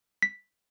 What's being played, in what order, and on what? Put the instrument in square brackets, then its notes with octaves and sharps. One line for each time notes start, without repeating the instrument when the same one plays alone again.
[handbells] B6